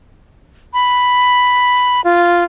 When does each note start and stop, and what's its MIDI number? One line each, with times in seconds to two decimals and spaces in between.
0.73 2.01 83
2.04 2.44 65